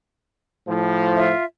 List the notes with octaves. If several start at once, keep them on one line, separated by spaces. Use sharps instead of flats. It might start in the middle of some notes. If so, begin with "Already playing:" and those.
A2 F3
F4 E5